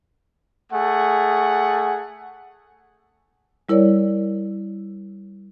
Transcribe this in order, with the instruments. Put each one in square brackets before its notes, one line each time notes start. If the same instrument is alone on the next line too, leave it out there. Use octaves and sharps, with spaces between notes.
[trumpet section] A3 G#4 F#5
[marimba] G3 E4 A#4 C#5 D5